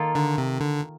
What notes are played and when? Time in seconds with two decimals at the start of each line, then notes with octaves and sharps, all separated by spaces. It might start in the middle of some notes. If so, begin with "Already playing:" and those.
Already playing: D#3 A#3 F4 A4
0.15 D3
0.38 C3
0.60 D3